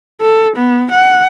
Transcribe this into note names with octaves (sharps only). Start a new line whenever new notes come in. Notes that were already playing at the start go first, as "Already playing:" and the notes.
A4
B3
F#5